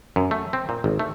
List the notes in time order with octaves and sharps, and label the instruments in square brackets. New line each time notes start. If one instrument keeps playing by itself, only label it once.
[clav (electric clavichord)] F#2
A3
C4
A#2
G#1
A3